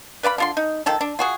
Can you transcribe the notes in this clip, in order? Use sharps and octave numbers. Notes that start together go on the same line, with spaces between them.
B4 D5 F5 B5
D3 F4 C6
D#4
D#3 F3 A4
D4
F4 F#4 G#4